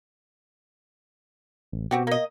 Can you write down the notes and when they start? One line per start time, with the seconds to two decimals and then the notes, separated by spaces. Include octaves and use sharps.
1.72 A1
1.91 B2 C4 F#4 G4
2.07 A#3 D#5